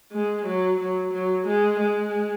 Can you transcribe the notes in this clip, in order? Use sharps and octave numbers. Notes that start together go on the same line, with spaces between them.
G#3
F#3
F#3
F#3
G#3
G#3